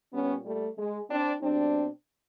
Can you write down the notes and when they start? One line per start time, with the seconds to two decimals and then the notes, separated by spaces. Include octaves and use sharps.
0.14 A#2 G3 B3 C#4
0.45 G3 A3
0.78 G#3
1.10 C4 D4
1.42 B2 G3 C4 D4